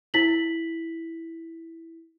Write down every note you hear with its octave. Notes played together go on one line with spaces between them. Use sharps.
E4 B6 F#7